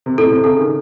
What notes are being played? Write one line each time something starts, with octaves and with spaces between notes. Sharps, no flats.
C3
A2 A4
C3
C#3 A4
D#3